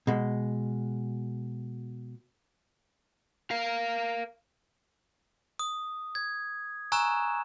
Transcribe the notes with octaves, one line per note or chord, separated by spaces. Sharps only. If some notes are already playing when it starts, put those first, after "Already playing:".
B2 G#3
A#4 F5
D#6
G#6
G#5 A#5 C#6 E6 F#6 E7